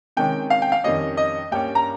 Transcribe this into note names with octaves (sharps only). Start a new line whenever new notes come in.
C3 D#3 G#3 C#4 G5
F5
G5
F5
F2 D#3 G3 C#4 D#5
D#5
G2 G3 A#3 C#4 G5
A#5